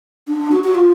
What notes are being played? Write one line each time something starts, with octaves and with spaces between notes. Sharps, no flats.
D4
F#4
F#4
F4